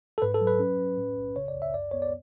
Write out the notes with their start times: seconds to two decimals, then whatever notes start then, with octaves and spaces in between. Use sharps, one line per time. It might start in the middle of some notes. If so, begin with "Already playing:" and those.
0.18 A4
0.22 G#2 B4
0.35 A4
0.41 F#3
0.47 B4
0.60 C#4
0.79 C#4
0.98 A2
1.17 B1
1.36 C#3 C#5
1.48 D5
1.55 C#2
1.62 E5
1.74 F#2 D5
1.91 B3 C#5
2.02 D5